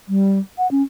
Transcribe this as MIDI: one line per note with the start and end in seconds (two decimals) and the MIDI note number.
0.09 0.39 55
0.58 0.69 78
0.71 0.82 61